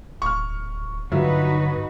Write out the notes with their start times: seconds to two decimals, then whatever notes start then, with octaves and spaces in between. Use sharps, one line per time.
0.22 D1 C#6 F6
1.12 G2 D3 F#3 D#4 F4 F#4 B4 E5